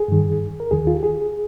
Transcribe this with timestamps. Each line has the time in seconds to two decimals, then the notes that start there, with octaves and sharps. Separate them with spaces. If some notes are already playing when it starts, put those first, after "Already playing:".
Already playing: G#4
0.08 G2 D#3
0.60 A#4
0.71 D#2 D#3 G#4
0.87 F4
0.95 G4
1.03 G#4